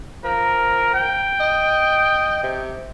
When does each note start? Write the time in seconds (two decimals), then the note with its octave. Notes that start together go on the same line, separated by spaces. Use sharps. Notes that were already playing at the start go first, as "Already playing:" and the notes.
0.24 F3 A#4
0.94 G5
1.40 D#5
2.43 C3